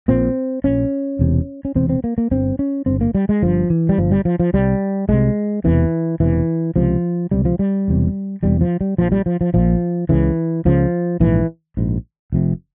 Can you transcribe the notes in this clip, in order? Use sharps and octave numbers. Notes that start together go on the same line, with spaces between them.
A#1 A#2 C4
A#1 A#2 C#4
E1 E2 C3
C#4
E1 E2 C3 C4
C4
A#3
A#3
G1 G2 C4
C#4
G1 G2 C4
A#3
G3
G#3
G1 G2 F3
E3
G3
G1 G2 F3
G3
F3
F3
C2 C3 G3
C2 C3 G#3
E1 E2 C3 E3
E1 E2 C3 E3
C#2 C3 F3
C#2 C3 G3
F3
G3
E1 E2 C3
E1 E2 C3 G3
F3
G3
A#1 A#2 F3
G3
F3
F3
A#1 A#2 F3
C#2 C#3 E3
C#2 C#3 F3
A#1 G#2 E3
A#1 G#2
F1 F2 C3